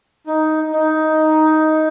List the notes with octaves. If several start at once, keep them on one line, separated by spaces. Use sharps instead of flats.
D#4
D#4